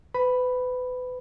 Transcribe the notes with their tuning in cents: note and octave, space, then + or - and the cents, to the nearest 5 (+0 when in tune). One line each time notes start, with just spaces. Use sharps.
B4 +30 B5 +0